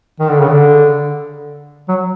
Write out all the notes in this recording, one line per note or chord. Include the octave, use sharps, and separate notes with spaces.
D#3
D3
C#3
D3
F#3